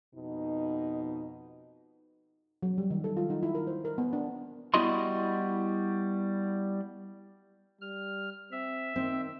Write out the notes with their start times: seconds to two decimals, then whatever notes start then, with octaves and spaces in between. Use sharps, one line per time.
0.14 F2 B2 D#4
2.63 F#3
2.78 G3
2.91 D#3
3.04 A4
3.17 F4
3.30 D#4
3.43 E4
3.55 A#4
3.67 C5
3.85 A#4
3.98 B3
4.13 D4
4.74 G3 B3 E4 F#4 D#5 C6
7.81 G3 F6
8.52 C4 E5
8.96 D#3 C4